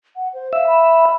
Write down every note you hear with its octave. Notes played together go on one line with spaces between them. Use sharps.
F#5
C5
E5 F5
B5